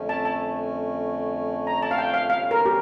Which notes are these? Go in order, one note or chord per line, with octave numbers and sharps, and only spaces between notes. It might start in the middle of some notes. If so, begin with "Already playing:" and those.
Already playing: F2 D3 A3 C#4
A5
A5
A#5
A5
F5
G5
F5
E2 D3 G3 C#4 F5
A#4
G4